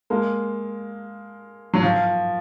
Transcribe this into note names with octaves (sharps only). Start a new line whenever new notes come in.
G#3 A#3
F#3
F3